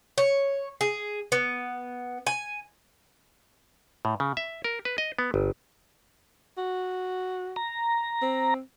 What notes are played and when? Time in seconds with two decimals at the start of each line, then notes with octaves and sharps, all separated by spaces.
0.18 C#5
0.81 G#4
1.32 B3
2.27 G#5
4.05 A2
4.20 C#3
4.37 E5
4.64 A#4
4.85 B4
4.98 D#5
5.19 B3
5.34 G1
6.57 F#4
7.56 A#5
8.22 C4